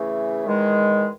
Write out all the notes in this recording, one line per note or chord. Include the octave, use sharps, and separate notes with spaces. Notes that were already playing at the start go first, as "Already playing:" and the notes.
Already playing: C#3 E3 A3
E2 D#3 G#3